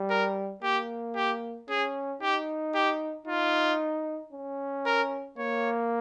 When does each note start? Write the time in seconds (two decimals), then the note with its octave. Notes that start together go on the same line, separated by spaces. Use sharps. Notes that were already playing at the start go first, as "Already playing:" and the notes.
Already playing: G3
0.10 A#4
0.63 A#3 G4
1.16 G4
1.69 C#4 G#4
2.22 D#4 G4
2.75 G4
3.26 D#4 F4
4.33 C#4
4.86 A#4
5.38 A#3 C#5